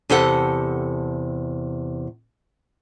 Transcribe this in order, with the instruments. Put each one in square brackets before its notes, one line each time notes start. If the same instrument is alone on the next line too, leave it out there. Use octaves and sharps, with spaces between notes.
[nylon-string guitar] E2 C3 G4 A4 F#5